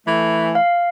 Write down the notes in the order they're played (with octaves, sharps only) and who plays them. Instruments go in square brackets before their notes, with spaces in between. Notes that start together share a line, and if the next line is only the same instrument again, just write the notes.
[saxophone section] E3 A3
[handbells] F5